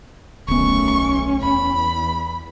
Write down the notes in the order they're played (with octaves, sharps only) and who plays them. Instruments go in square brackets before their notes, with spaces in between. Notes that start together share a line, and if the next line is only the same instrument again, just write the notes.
[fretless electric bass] D1 B3 [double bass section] B1 D#3 A3 [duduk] C#4 [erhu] C#6
[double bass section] E2 [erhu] B5